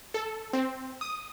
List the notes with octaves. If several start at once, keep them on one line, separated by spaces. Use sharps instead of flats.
A4
C4
D#6